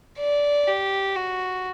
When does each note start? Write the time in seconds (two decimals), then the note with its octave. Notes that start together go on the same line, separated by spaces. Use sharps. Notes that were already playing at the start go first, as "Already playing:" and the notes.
0.19 D5
0.67 G4
1.16 F#4